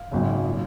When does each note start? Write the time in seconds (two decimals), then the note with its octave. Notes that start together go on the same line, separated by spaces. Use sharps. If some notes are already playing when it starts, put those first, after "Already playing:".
Already playing: F5
0.12 G#1 F#2 C#3
0.49 A#2